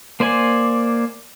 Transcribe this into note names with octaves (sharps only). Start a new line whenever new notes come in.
A#3 C5 D5 G#5